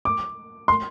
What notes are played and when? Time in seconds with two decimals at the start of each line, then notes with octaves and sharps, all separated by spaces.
0.05 D6
0.68 C6